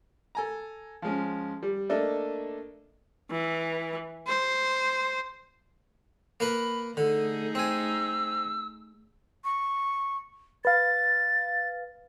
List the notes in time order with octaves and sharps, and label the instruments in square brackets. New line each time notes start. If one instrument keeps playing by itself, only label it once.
[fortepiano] A4 G#5 A#5
F3 G#3 C#4
G3
A3 A#3 D4 A4 D#5 E5
[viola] E3
C5
[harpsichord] A#3 A#4 B4 [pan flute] B5
[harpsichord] D3 [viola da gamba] A3 D#4 G#4 [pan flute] A4
[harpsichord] C4 G#5 [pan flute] E6
[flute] C#6
[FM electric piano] B4 F5 [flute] A6